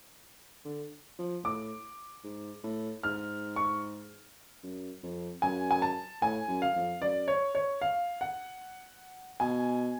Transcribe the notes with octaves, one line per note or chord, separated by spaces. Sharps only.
D3
F3
A2 D6
G#2
A2
G#2 F6
C#6
F#2
F2
F#2 G#5
G#5
A5
A2 G#5
F#2
F5
F2
F#2 D5
C#5
C#5
F5
F#5
B2 G#5